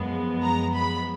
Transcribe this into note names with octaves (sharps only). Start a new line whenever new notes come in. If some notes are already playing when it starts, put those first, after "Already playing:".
Already playing: F#2 F3 G#3 B3
A#5
B5